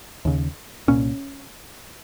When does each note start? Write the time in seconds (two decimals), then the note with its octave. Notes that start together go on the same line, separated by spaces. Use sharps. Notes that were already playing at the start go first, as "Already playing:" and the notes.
0.25 D#2 C#3
0.88 C2 A#2 C#4